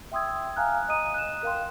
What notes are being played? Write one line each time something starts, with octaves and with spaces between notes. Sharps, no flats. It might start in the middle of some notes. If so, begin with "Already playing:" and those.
E5 G5 C6 D#6 E6 G#6
F5 G#5 A#5 F6 F#6
D#5 A#5 D#6 D#7
F#6 E7
A#4 F5 G5 C6